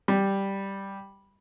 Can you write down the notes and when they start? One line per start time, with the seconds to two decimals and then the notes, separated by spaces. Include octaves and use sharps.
0.08 G3